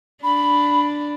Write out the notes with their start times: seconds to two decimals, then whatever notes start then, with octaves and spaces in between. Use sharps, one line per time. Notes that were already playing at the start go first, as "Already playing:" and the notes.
0.23 D4 B5